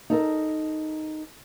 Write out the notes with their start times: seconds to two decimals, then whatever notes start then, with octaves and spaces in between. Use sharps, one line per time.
0.10 D#4 A4 A#4